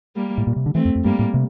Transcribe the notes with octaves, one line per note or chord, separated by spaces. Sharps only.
G3 A#3
A2
A#2
C3
D3
E3 A3 C4
F2
F2
G2 G3 A#3
A2
C3